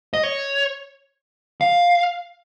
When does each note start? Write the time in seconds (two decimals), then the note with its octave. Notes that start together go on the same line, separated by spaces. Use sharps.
0.14 D#5
0.23 C#5
1.61 F5